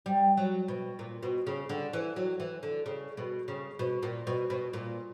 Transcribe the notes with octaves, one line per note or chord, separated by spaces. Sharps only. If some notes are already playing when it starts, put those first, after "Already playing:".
G3
F#3
B2
A#2
B2
C#3
D3
E3
F#3
E3
D3
C#3
B2
C#3
B2
A#2
B2
B2
A#2